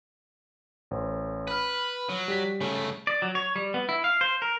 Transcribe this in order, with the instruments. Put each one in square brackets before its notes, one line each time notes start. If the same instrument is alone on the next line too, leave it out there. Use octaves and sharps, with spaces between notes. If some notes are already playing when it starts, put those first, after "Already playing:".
[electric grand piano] A1 C5
[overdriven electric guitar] B4 [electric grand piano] B5 F6
[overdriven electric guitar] F#3
[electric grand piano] G3 B6
[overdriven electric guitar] C#3 A3 [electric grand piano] C#4
[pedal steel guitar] D5
F#3
C#5
G3
B3
E4
F5
C5
A#4